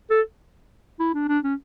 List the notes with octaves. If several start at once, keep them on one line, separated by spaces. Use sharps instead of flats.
A4
E4
D4
D4
C#4